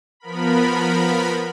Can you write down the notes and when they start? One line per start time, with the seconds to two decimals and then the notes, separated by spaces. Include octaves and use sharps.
0.20 F3 B3 A#4 B5